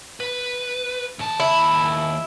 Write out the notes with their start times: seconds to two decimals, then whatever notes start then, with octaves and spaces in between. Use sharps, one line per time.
0.20 B4
1.19 D#2 A5
1.40 E4